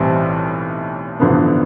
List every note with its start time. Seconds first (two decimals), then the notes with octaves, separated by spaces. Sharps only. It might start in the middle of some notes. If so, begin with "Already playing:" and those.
Already playing: B1 A2 E3 G3 C4
1.19 A1 G2 D3 F3 B3